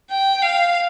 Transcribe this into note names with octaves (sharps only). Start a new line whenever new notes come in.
G5
F5